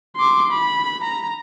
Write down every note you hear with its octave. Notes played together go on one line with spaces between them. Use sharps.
C6 D6
B5
A#5